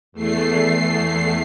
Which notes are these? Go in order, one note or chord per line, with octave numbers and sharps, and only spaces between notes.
E2 A3 C7